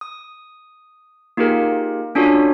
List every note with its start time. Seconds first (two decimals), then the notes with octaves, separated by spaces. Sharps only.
0.01 D#6
1.37 A#3 D#4 F4 G4 G#4 A#4
2.15 C#4 D4 F4 F#4 A4 C#5